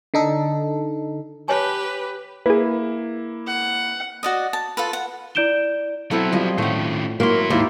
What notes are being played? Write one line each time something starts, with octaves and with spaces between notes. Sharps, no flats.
D3 D#4 A4
G4 B4 C#5 G#5 A5
A#3 E4 G#4 B4
F#5
F#4 D5 D#5
A5
F4 A4 B4
F#5
E4 D5 G6 D7 E7 G7
F#3 B3 C4 E4 A4 F#5
F3 G3 D#5
A2 D#3 A3 C#4 F#5
G#2 F#3 A#3 E4 C6
D#2 A#3 E4 F4 G4